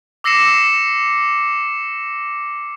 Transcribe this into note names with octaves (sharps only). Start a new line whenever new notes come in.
D6 E6 A#6 C7 C#7 E7